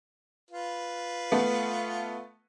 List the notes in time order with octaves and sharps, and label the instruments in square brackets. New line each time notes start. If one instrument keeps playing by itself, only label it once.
[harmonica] F4 B4
[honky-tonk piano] A3 B3